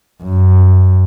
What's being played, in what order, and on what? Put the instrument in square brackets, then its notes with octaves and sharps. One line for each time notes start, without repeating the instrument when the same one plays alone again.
[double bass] F#2